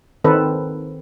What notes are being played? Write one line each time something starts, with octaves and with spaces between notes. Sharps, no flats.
D#3 C4 A4 B4